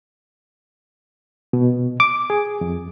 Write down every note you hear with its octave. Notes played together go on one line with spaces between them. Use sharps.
B2
D6
G#4
F2